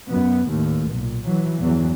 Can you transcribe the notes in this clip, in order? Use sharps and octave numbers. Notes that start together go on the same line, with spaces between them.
F#2 B3
D#2 A2
B1 A#2
E3 F#3
E2 G2 E3 F#3